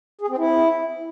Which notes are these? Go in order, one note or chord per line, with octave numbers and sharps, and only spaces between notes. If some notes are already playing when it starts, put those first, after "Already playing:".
G#4
C4
E4